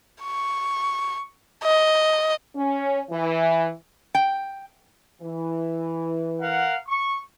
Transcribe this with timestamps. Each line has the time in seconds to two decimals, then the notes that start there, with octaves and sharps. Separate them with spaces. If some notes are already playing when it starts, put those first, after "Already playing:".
0.23 C#6
1.64 D#5
2.55 C#4
3.10 E3
4.15 G5
5.22 E3
6.40 A#4 F5 F#5
6.87 C#6